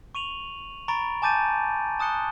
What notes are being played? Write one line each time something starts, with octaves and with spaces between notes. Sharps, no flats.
C#6 D#7 F7 F#7
A#5 B5 C#6 A6 D7
G#5 A5 D6 G6 A6 D#7
A5 D#6 F#6 C#7 G7